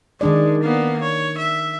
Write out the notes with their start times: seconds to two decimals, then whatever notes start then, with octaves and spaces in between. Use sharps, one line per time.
0.21 D#3 G#3 D4 D5
0.63 A#3 B3
1.02 C#5
1.38 E5